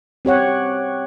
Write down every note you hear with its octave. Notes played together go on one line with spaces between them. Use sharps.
C4 G4 C#5 F#5